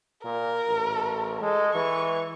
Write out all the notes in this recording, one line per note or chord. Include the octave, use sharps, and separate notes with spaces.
A#2 A#4
A1
G#3 A4
E3 C#6